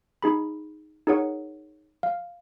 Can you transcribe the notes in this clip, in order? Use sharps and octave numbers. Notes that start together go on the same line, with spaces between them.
D#4 G#4 B5
D#4 G#4 A#4 C#5 F#5
F5